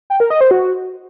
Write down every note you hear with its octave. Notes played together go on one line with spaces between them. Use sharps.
G5
A#4
D#5
C5
F#4